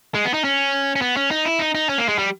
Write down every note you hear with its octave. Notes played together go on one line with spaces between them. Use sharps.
G#3
B3
D#4
C#4
C#4
B3
C#4
D#4
E4
D#4
D#4
C#4
A#3
G#3
G3